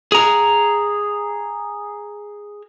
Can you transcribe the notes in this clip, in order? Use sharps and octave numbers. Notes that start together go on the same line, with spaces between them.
G#4 A#5